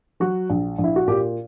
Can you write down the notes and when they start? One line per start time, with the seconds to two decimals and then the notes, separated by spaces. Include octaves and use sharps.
0.20 F#3 F#4
0.50 A#1
0.78 A#1
0.84 E4
0.96 F#4
1.08 A#2 G4